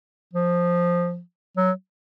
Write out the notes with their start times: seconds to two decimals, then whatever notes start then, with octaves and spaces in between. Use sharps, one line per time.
0.33 F3
1.57 F#3